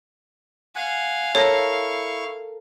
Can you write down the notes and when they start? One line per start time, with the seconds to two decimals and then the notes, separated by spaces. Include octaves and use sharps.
0.76 F5 F#5 G#5
1.35 E4 A4 A#4 C#5 C#6